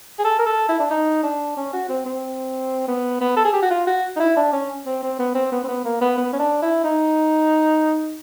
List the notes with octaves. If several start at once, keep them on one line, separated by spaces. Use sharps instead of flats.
G#4
A4
A#4
A4
E4
D4
D#4
D4
C#4
F#4
C4
C4
B3
B3
A4
G#4
G4
F#4
F4
F#4
D#4
E4
D4
C#4
C4
C4
B3
C4
B3
C4
B3
A#3
B3
B3
C#4
D4
E4
D#4